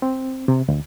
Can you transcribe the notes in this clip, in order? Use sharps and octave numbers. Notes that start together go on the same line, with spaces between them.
C4
C3
D2